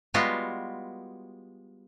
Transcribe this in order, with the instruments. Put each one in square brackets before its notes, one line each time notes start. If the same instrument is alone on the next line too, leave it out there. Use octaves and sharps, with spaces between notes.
[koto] G3 G#3 B3 F4 F#4